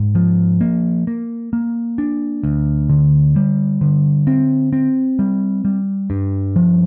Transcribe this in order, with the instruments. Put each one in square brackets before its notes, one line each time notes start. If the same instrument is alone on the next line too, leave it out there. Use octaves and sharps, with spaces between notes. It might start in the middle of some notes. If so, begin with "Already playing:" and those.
Already playing: [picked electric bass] G#2
F3
A#3
A#3
A#3
D4
D2
D3
G3
D3
C4
C4
G3
G3
G2
F3